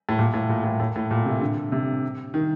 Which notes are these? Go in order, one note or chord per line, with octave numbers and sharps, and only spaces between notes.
A2
A#2
A2
A#2
A2
A2
A2
A#2
C3
D3
C3
D#3